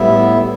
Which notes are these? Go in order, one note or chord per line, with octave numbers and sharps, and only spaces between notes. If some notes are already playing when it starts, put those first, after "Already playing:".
Already playing: A2 G3 B3 E4 E5